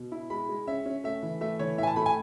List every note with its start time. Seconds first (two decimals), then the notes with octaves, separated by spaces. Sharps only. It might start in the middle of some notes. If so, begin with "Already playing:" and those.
Already playing: B2
0.12 E4
0.30 G#3 B5
0.49 G#3
0.67 C#4 E5
0.86 C#4
1.04 A3 E5
1.22 E3
1.41 A3 E5
1.59 E3 C#5
1.78 A2 E5
1.83 G#5
1.87 A5
1.96 A3 B5
2.06 G#5